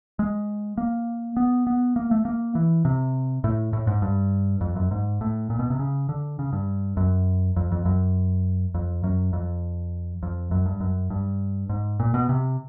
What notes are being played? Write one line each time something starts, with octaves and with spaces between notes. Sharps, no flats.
G#3
A#3
B3
B3
A#3
A3
A#3
E3
C3
A2
A2
G#2
G2
F2
F#2
G#2
A2
A#2
B2
C3
C#3
D3
C#3
G2
F#2
F2
F2
F#2
F2
F#2
F2
F2
F#2
G2
F#2
G2
G#2
A#2
B2
C3